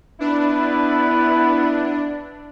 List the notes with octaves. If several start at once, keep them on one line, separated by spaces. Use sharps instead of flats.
B3 D4 E4